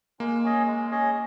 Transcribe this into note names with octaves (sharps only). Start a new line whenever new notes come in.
G#3 A#3
C#4 G#4 D#5
G#3
C#4 G#4 D#5